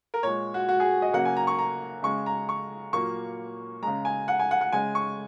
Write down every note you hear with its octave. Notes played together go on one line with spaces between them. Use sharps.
A#4
A#2 G#3 C#5
F#4
F#4
G#4
D#5
C#3 F#3 A#3 F#5
G#5
A#5
C#6
A#5
C#3 G#3 C#6
A#5
C#6
A#2 F#3 A#3 C#6
C#3 G#3 A#5
G#5
F#5
G#5
F#5
F#5
C#3 G#3 G#5
C#6